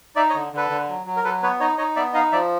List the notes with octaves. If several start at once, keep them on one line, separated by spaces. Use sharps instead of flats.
D#4 D5 E5
C#5 D#5
D3
D3 A4 B4
D3
F#3
F#3
A#4
F#3 A4 B4
B3 B4 C#5
D#4 C#5 D#5
D#4 C#5 D#5
B3 D5 E5
D#4 D#5 F5
F3 D5 E5